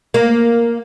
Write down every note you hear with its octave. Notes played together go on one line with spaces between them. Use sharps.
A#3